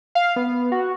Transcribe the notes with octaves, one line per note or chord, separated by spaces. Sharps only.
F5
B3
F#4